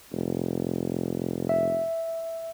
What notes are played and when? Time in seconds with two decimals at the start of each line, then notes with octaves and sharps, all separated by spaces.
0.12 F1
1.49 E5